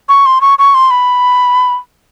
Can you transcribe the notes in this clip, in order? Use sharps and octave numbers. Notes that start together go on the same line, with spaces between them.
C#6
C6
C#6
C#6
C6
B5